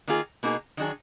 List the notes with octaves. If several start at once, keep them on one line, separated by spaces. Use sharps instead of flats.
D#3 A#3 F4 G#4
B2 A#3 D#4 G#4
D#3 F#3 D4 G#4